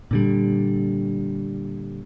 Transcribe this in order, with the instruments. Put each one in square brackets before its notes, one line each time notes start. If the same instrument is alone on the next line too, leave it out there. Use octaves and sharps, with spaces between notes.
[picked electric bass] A#2 D3 G3